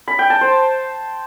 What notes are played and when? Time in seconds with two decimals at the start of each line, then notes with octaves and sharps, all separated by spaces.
0.08 B5
0.19 G5
0.30 A5
0.41 C5